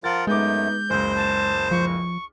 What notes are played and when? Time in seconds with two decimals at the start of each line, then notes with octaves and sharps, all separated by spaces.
0.04 F3 F4 A#4 F#5 A6
0.27 F#2 G#3 A3 B3 D#4 D6 G6
0.90 F#1 C#2 C5
1.15 A5
1.71 F3 C#6